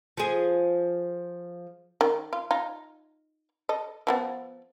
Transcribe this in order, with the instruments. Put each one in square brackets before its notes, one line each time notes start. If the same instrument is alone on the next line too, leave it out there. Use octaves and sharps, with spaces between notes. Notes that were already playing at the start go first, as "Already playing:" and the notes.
[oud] F3 G#4
[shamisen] D#3
F4
D#4 F4
A4 D#5
F3 G3 B3